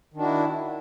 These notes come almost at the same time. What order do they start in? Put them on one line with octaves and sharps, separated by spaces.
D#3 D4 F#4 E4